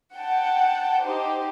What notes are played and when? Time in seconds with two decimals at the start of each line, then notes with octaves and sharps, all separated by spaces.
0.14 F#5 G5 A5
1.01 D#4 G4 C5